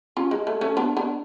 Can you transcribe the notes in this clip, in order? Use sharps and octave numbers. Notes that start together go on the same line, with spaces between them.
C#4 F4
G#3
A3
A3 C#4
B3 D4
B3 D4